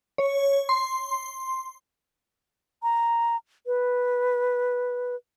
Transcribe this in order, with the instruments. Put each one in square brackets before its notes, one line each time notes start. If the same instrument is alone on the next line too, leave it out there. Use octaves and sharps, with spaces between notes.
[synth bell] C#5
C6
[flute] A#5
B4